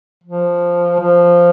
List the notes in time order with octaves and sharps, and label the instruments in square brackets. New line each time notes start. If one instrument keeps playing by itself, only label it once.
[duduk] F3
F3